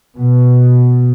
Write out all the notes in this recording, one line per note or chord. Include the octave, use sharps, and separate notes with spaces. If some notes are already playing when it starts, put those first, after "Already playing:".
B2